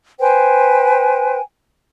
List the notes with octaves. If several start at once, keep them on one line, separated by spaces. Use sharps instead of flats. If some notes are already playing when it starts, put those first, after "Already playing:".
B4 C5 G5 G#5